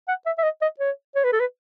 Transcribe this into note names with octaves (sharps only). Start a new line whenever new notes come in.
F#5
E5
E5
D#5
D#5
C#5
C#5
B4
A4
B4